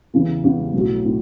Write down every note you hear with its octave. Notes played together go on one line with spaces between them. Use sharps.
E2 C#3 E3
E2 C#3 E3
B1 A2 F#3
A2